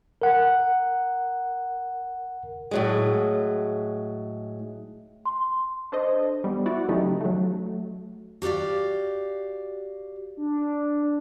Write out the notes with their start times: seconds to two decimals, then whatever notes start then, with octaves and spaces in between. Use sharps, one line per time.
0.22 A#4 F#5
2.71 A2 F#3 G#3
5.26 C6
5.92 D4 A4 C5 D#5
6.44 G3 B3
6.66 E4 F#4 D5 F#5
6.89 C#3 F#3 A3 D#4 G4
7.21 F#3 A3
8.42 F#4 G4 A#4 D5 F5
10.37 D4